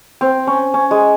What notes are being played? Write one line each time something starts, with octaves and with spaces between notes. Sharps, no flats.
C4
C#4
C#4
G#3